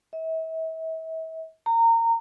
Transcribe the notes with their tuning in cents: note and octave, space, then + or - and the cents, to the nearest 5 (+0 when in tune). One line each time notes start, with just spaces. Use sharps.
E5 -40
A#5 -25